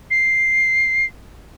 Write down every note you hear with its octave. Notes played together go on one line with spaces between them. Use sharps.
C7